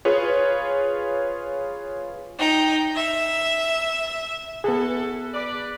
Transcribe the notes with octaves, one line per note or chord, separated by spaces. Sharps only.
F4 G#4 B4 C#5
D#4 G5
E5
B3 E4 F#4 G#4 A4
B4 D5